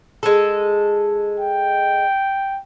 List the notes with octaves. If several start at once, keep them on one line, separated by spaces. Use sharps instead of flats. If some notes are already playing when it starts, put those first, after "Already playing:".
G#3 A4
G5